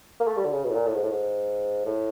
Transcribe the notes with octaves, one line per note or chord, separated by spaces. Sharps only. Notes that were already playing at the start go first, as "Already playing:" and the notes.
A#3
A3
G3
D3
C#3
B2
A2
A#2
A2
G#2
A2
G#2
A2